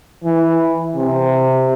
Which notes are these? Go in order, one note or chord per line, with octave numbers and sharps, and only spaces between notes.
E3
C3